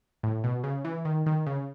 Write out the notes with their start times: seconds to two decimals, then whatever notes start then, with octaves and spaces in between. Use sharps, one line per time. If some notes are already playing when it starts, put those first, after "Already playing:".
0.23 A2
0.44 B2
0.64 C#3
0.85 E3
1.05 D#3
1.26 D#3
1.46 C#3